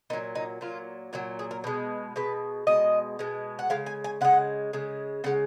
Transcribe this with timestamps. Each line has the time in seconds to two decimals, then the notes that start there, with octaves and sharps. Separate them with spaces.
0.10 A#2 D#4
0.13 F#3
0.35 D#4
0.61 A#2 F#3 F4
1.13 A#2 F#3 F#4
1.39 G#4
1.51 A#4
1.64 B2 G#3
2.16 B2 G#3 B4
2.67 B2 G#3 D#5
3.19 B2 G#3
3.59 F#5
3.70 C#3 G#3 F5
3.86 G#5
4.04 G#5
4.21 C#3 G#3 F#5
4.73 C#3 G#3
5.24 C#3 G#3 F#5